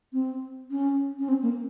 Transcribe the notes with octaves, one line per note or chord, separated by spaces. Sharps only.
C4
C#4
C#4
C4
A#3